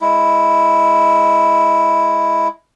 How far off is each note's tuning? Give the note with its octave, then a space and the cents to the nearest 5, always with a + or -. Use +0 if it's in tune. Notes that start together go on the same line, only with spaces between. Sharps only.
G#3 +0 E4 +0